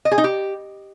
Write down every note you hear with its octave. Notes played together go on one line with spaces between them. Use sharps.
D#5
G#4
D#4
G4